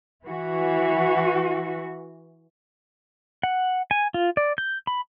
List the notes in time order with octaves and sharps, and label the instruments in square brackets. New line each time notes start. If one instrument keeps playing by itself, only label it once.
[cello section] E3 F#4
[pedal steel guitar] F#5
G#5
F4
D5
G6
B5